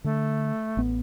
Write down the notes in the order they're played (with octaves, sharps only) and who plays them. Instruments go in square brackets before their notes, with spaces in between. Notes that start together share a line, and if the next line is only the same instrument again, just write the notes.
[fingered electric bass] D3 [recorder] A3
[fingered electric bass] A1 B3